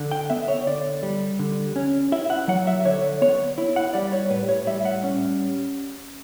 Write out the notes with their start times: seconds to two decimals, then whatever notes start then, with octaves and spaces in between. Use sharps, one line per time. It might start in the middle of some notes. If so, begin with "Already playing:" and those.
Already playing: D3
0.11 G5
0.30 B3 E5
0.48 C#5
0.67 D3 D5
1.03 G3
1.39 D3
1.76 C#4
2.12 E4 E5
2.30 F#5
2.48 F#3 F#5
2.67 E5
2.85 D3 C#5
3.22 B3 C#5
3.58 E4
3.76 F#5
3.94 G3 D5
4.12 C#5
4.30 A2 B4
4.49 C#5
4.67 G3 E5
4.85 F#5
5.04 C#4